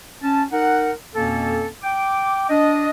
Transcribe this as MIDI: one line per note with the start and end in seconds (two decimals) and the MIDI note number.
0.22 0.43 61
0.22 0.43 81
0.52 0.91 63
0.52 0.91 70
0.52 0.91 78
1.15 1.67 41
1.15 1.67 47
1.15 1.67 58
1.15 1.67 61
1.15 1.67 69
1.83 2.47 79
1.83 2.47 86
2.49 2.90 62
2.49 2.90 75